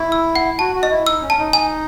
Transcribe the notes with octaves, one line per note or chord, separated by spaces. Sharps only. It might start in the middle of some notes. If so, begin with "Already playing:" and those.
Already playing: E4 C#6
E6
F#5
F#4 A5
F#4
D#5
E4
D#4 E6
C#4
A5
D#4
G#5